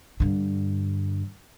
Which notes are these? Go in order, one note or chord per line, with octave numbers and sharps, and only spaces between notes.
G2 D3